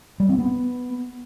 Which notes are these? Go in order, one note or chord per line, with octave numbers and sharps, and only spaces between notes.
G3
C4
B3